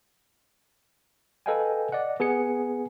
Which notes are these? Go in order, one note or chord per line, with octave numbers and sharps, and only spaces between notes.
A4 B4 D#5 F5 G5 G#5
D5 D#5 F#5
B3 G#4 G#5 C#7